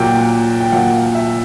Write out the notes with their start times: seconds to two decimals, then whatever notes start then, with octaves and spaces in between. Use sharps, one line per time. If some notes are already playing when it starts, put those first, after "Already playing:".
Already playing: A#2 F#3 A#3 G5
0.61 G5
0.72 A#2 F#3 A#3 F#5
0.93 F5
1.15 E5